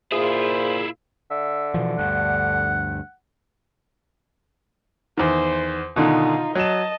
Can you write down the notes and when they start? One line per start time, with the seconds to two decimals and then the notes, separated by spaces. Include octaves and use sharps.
0.12 A#2 E4 F4 G#4 C5
1.31 D3 E5
1.74 B2 E3 F3
1.99 D2 G2 F#5
5.17 E2 D#3 C5
5.96 B2 D3 D#3 D#4 F4
6.55 F#3 D#5 A5 E7